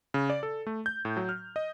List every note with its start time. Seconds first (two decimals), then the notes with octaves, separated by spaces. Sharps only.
0.14 C#3
0.30 D5
0.43 A4
0.67 A3
0.86 G6
1.05 A2
1.17 F#3
1.29 F6
1.56 D#5